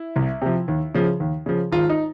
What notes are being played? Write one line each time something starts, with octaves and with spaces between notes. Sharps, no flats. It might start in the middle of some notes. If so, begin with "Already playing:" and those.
Already playing: E4
C2
C3 F3
D#2
C#3 F3
D#2
C#3 F3
G#1 F4
D#4